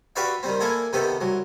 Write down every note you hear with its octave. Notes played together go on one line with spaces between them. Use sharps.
F#4 G4 B4 D5 E5 F5
D#3 G3 C4
A#3 E4 G#4 A4
C3 D#3 B3 G4 A4
C2 F#3